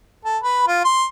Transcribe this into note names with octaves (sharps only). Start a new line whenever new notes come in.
A4
B4
F4
C6